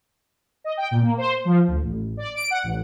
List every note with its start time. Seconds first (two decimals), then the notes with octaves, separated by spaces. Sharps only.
0.64 D#5
0.77 G5
0.91 A#2
1.02 A#3
1.18 C5
1.45 F3
1.68 D2
1.82 A1
2.17 D5
2.36 D7
2.50 F#5
2.63 A1